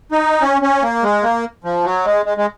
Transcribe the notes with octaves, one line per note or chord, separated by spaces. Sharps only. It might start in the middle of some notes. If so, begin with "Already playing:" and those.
D#4
C#4
C#4
A#3
G#3
A#3
F3
F#3
G#3
G#3
G#3